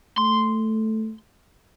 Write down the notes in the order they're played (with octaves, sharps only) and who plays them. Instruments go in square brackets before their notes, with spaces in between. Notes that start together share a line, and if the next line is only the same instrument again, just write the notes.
[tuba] A3 [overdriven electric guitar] C6